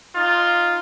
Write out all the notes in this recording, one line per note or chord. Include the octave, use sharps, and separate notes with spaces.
D#4 F4